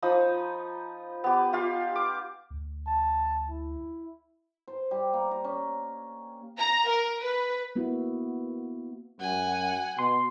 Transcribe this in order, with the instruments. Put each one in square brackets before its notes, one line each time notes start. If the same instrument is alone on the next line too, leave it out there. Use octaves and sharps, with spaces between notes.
[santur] F3 D#4 B5 D#6
B3 G4
F4 G4 F5
D6
[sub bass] D2
[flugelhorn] A5
E4
[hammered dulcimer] C5
G3
A#3
A#5
C#4
[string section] A#5
A#4
B4
[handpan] A#3 B3 E4 F#4
[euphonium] F#2 [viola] F#5 [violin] G#5
[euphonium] B2 [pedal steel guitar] C6